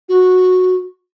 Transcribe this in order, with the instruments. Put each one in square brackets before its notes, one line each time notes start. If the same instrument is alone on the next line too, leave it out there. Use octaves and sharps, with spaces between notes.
[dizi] F#4